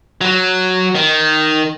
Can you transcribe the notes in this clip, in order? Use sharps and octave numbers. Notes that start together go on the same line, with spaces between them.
F#3
D#3